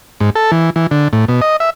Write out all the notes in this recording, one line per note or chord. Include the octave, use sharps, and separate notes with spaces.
G#2
A4
E3
E3
D3
A2
B2
D#5
E5